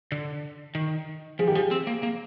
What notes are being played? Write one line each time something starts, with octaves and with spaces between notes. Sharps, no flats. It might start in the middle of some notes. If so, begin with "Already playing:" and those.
D3
D#3
F3 G#4
D#3 G4
F3 G#4
C4
A#3
A#3